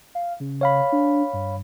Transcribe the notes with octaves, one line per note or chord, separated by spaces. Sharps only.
F5
C#3
C#5 F5 B5
D4
G2